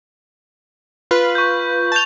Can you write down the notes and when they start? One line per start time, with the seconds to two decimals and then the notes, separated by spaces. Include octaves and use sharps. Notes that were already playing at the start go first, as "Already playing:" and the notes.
1.11 F4 B4
1.35 C#6 G6
1.92 A5 G6 A6 F7